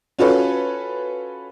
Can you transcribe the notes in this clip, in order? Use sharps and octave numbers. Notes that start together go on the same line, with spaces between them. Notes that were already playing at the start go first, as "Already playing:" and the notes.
C#4 F4 F#4 A4 B4 C#5